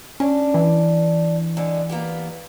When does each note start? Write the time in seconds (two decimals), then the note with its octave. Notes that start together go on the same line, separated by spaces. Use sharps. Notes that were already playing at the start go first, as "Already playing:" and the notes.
0.20 C#4 D4
0.54 E3
1.57 D3 G#3
1.89 A#3 B3 G4